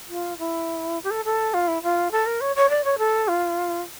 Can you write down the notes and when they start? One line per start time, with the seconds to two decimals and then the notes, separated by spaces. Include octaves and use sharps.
0.09 F4
0.38 E4
1.04 G4
1.10 A4
1.25 A4
1.54 F4
1.67 E4
1.83 F4
2.11 A4
2.26 A#4
2.41 C#5
2.56 C#5
2.69 D5
2.84 C#5
2.98 A4
3.28 F4